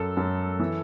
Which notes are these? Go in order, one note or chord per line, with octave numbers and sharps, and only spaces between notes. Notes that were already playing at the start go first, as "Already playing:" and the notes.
Already playing: F#2 A4
F#2
E3